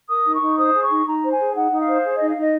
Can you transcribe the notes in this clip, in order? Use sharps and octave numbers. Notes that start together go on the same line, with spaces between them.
A#4 D#6
D#4
C#6
D#4
C5 D#6
G#4
C#6
D#4
D#4 A#5
C5
G#5
G#4
D#4 F#5
D#4
F5
C5
G#4
D#4 D#5
F5
D#4 D#5